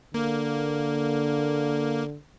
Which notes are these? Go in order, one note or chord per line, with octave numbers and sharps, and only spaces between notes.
D3 A#3